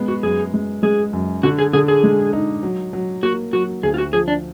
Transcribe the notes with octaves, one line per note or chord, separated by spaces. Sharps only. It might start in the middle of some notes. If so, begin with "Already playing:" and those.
Already playing: G#3 B3
F#4
F#2 G#4
G#3
G#3 G#4
F#2
D3 F#4
G#4
D3 G#4
G#4
G#3
D#4
F#3
F#3
A#3 F#4
F#3 F#4
D2 G#4
F4
F#4
F3 G#4
D4